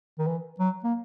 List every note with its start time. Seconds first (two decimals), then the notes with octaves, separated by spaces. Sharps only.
0.18 D#3
0.26 E3
0.59 F#3
0.84 A#3